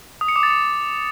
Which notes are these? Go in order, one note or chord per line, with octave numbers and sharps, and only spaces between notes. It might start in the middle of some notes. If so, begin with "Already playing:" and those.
D#6
C#7
D6
A6
C#7